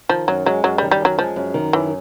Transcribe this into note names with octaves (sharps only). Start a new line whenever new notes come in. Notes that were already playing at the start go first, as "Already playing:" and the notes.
D#3 F3
F#2 F#3
F#3 G#3
F#2 F#3
D#3 G3
G3
F#2 F#3
F3 G#3
F#2
D#3
F#2 E3